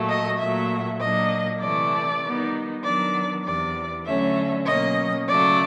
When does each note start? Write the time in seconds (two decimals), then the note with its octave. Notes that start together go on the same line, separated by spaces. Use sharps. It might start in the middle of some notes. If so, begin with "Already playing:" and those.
Already playing: A#2 F#3 A3
0.09 D#5
0.39 A#2 F#3 A3 E5
1.00 A#2 F#3 A#3 D4 D#5
1.61 C3 E3 A3 D5
2.23 D#3 G3 B3 D#4
2.83 D#3 F#3 B3 D4 D5
3.45 E2 C3 E3 D5
4.06 D3 F#3 A3 C#4 E5
4.66 B2 F#3 A#3 C#4 D#5
5.28 C#3 F#3 A3 D5